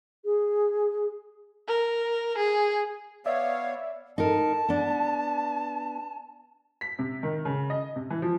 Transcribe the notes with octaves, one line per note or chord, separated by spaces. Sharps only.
G#4
A#4
G#4
B3 C#5 D5 E5 F5
D#4 A#4 A5
B3 D4
B6
C3
D#3
C#3
D#5
C3
E3
F3